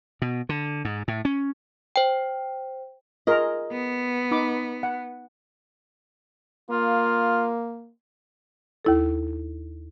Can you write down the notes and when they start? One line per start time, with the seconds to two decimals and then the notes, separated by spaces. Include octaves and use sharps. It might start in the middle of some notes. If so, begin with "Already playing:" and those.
0.22 B2
0.49 D3
0.85 G#2
1.08 A2
1.25 C#4
1.96 C5 G5
3.27 F4 G#4 A#4 D#5
3.71 B3
4.31 D#4 B5 D6
4.83 F#5
6.71 A#3 F4
8.85 D#2 E4 A4